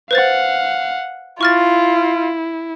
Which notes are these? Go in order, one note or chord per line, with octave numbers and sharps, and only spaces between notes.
B4 C5 F5 F#5 A6
E4 F4 C#6 F6 A6